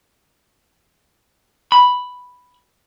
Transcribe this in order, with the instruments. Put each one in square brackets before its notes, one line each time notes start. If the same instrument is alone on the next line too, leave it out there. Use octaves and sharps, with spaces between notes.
[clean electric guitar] B5